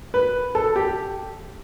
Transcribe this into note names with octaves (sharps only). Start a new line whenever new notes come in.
B4
A4
G4